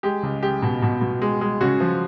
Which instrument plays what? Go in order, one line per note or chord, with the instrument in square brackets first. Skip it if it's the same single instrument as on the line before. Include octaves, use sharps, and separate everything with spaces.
[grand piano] G#3 G4
C#2
G#3 G4
B2
B2
B2
G#3
G#3
C#3 F#4
F3